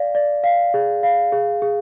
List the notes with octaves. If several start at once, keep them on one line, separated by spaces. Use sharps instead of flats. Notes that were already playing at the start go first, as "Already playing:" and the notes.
Already playing: D5 F5
D5
F5
G#4
F5
G#4
G#4